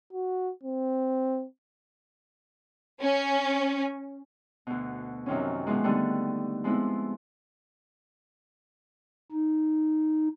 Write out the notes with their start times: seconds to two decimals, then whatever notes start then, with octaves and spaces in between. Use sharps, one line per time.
0.13 F#4
0.63 C4
3.01 C#4
4.67 D2 B2
5.26 F#2 C3 D#3 F3 C#4
5.67 B2 E3 F3 G#3
5.84 D3 D#3 G3 A3 B3
6.64 F3 G#3 B3 C4 D#4 E4
9.32 D#4